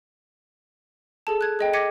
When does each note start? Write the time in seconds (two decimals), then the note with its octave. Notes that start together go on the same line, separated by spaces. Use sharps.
1.27 G#4 A4 A5
1.41 F#6 G#6
1.59 G#4 D#5 G5
1.73 D6 G#6 A#6 B6 C#7 D#7